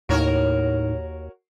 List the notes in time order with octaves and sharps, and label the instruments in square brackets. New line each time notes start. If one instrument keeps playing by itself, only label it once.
[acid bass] D#2 [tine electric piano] A2 D#4 [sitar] F#4 A#4 C#5